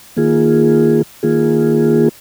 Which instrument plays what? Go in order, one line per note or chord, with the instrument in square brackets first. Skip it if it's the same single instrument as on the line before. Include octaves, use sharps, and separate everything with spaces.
[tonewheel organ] D#3 A#3 F4 G#4
D#3 A#3 F4 G#4